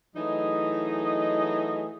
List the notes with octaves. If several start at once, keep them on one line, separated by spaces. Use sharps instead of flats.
E3 F#3 A3 D#4 G#4 D#5